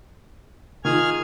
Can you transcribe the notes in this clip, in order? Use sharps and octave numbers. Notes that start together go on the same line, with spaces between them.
D#3 F4 G#4 F6 G#6